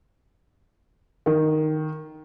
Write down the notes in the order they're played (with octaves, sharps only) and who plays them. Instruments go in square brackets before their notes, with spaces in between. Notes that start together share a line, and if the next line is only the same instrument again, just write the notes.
[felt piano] D#3